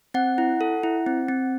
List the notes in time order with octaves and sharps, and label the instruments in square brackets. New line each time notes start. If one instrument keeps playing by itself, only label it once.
[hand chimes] C4 F#5
E4
A4
E4
C4
C4